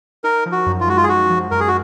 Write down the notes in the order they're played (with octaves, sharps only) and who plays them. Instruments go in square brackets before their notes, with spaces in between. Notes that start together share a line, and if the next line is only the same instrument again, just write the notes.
[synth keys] D#4 [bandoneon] A#4
[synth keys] F3
[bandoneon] F#4
[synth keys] F#2
[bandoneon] F4
[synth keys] G#3 [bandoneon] F#4
[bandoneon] F4
G#4
[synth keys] D#4 [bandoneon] F#4
[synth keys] F3
[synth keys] F#2 [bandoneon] A#4
[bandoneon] G#4
F#4